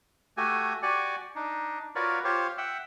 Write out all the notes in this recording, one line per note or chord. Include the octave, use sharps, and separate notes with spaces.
A3 F#4 G4 G#5
F#4 G4 D5 G#5 C#6
D4 D#4
F4 F#4 A#4 B4 C#5 D5
F4 G4 C5 C#5
E5 F#5 G5